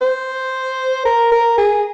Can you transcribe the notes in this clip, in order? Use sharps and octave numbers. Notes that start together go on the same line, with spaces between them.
C5
A#4
A#4
G#4